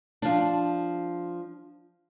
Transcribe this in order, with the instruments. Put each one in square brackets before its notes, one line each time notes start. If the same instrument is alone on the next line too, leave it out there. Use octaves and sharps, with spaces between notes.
[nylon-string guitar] F3 D4